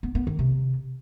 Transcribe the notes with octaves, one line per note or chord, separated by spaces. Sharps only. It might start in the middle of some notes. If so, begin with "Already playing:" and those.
B3
B3
D#3
C3